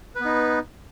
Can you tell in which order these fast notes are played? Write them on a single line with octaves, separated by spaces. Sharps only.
B4 B3 D#4